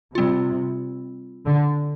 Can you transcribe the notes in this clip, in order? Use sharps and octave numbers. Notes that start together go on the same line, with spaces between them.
C3 G3 C4 F4
D3